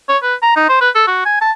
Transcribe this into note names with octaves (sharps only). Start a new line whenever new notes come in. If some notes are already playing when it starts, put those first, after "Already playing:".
C#5
B4
A#5
D#4
C5
B4
A4
F#4
G#5
A5